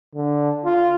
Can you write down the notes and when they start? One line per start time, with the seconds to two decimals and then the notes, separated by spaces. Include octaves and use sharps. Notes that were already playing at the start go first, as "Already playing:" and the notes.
0.15 D3
0.65 F4